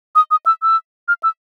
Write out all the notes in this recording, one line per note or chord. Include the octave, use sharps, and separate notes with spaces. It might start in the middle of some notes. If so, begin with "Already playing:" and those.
D#6
D#6
E6
E6
F6
E6